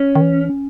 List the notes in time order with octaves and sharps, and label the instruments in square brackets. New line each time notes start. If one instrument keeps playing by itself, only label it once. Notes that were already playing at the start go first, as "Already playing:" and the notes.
Already playing: [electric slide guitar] C#4
[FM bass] D#3
E3
C#4